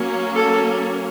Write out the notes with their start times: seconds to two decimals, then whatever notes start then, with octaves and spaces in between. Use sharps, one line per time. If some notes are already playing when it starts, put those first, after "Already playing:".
Already playing: F#3 A#3 C#4
0.35 A4